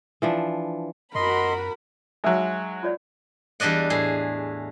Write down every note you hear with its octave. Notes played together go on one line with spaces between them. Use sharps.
E3 F3 D4
F#2 F#4 A#4 D#5 B5 C6
F#3 G#3 D#4 E5 E6
F4 C#5 D5
E2 G3 D4 D5 D#5 F#5
A2 G#4